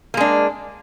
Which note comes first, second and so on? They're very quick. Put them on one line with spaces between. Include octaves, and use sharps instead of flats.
A#3 G#3 D4